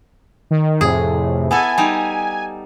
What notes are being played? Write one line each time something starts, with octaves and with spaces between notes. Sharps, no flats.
D#3
F2 A2 C3 G#4
B3 E4 A4 G#5
G3 D#4